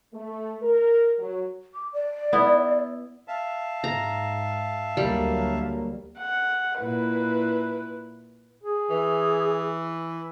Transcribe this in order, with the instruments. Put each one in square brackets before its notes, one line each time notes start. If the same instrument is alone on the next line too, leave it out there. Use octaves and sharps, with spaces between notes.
[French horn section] A3
A#4
F#3
[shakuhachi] D6
D5
[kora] B3 E4
[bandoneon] E5 F5 A5
[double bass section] G#2 [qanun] A#5
[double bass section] D2 F#3 A#3 [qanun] G3
[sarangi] F#5
[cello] A#2 E4 [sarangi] B4
[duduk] G#4
[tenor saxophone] E3